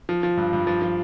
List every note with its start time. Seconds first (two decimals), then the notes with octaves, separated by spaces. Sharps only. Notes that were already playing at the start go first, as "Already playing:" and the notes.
0.09 F3
0.23 F3
0.37 G2
0.53 G2
0.67 F3
0.82 F3